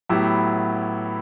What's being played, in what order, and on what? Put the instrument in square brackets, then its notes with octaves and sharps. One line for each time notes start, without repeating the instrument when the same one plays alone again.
[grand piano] A2 F#3 B3 E4 G4